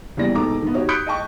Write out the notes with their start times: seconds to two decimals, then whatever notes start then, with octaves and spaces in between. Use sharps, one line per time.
0.17 D#1 E2 G3 D5 A#6
0.34 E1 B2 D#4 A4 A#5 D6
0.62 D#3 B3
0.74 D#4 F#4 G4 C#5
0.89 D#6 F#6 G6 B6 C#7 D7
1.07 D#5 G5 A5 C#6